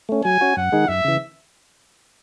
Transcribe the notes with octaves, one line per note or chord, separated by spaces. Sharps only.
A3 C#4
F#3 G#5
C#4 F#4
F#2 F#5
D#3 G#3 D#4 G#4
F#2 E5
C#3 E3